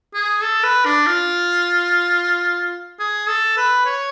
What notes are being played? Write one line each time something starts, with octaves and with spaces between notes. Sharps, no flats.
G#4
A4
B4
D4
F4
G#4
A4
B4
C#5